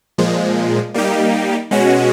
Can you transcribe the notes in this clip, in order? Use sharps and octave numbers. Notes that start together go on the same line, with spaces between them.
A#2 F3 G#3
G3 A#3 D#4 G4
B2 G#3 C#4 F#4